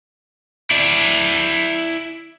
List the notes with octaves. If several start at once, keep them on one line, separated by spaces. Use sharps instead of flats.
E4 D5